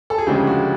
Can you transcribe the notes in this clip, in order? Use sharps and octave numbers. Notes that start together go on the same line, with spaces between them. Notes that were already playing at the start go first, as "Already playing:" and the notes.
A4
G#4
D2 C#3 F3 G#3 G4
F#4